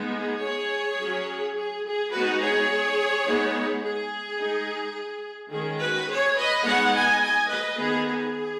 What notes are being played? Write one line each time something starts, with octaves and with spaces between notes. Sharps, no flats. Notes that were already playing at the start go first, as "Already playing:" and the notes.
Already playing: G#3 B3 D#4
G#4
G#4 C#5
F#3 C#4
G#4
G#4
G#3 B3 D#4 F#4 B4
G#4 C#5
G#3 B3 D#4
G#4
G#3 D#4
D#3 G#3 C#4 G#4
F#4 B4
G#4 C#5
B4 D#5
G#3 B3 D#4 C#5 F#5
D#5 G#5
D#5 G#5
B4 D#5
D#3 B3 D#4 G#4
G#4